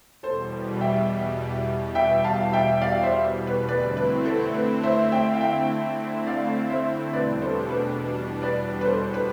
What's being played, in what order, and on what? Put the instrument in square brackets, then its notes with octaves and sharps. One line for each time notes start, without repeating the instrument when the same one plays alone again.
[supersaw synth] E2 B2 G3 [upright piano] A4 C5
[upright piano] E5 G5
E5 G5
F5 A5
E5 G5
D5 F5
C5 E5
B4
[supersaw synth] D3 A3 C4 E4 [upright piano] B4 D5
[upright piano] B4
A4
B4
C5 E5
E5 G5
F5
E5 G5
D5 F5
C5 E5
[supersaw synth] E2 B2 G3 D4 [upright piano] B4 D5
[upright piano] A4 C5
B4
B4 D5
B4
A4 C5
B4